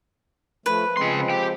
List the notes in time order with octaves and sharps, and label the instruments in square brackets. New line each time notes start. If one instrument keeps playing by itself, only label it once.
[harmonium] F3 A3 [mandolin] B4
[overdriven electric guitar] C#3 C6 [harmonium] F3 G#3 C4
[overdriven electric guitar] G4 G5